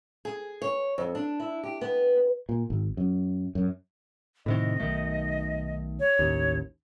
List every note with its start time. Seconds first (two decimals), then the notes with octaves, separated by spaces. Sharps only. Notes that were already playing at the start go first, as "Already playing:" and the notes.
0.25 G#4
0.62 C#5
0.98 F2
1.15 D4
1.40 E4
1.63 G4
1.81 B3
2.49 A#2
2.70 G#1
2.97 F#2
3.55 F#2
4.46 A2 C3 D#3 D#5
4.80 B1 D#3 A3
6.00 C#5
6.19 A1 D#2